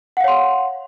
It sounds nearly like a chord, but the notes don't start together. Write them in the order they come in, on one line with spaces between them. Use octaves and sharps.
F#5 F5 C#5 C6